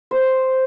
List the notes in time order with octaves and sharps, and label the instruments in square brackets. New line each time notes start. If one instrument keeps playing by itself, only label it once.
[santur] C5